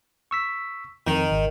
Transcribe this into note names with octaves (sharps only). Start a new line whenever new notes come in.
C#6 E6 B6
F2 D#3
G#1